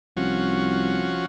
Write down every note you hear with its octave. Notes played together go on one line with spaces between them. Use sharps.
C2 F3 C#4 F#4